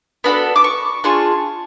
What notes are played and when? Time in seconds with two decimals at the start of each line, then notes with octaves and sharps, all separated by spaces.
0.24 B3 D4 F#4 A4 B5
0.56 D6
0.64 C#6
1.04 D4 F4 G#4 C#6